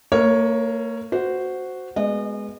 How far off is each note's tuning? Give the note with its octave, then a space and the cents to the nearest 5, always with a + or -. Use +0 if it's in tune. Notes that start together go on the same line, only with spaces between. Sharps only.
A#3 -35 A#4 +25 C#5 +0
F#4 +0 C5 -10
G#3 +0 B3 +0 D#5 -35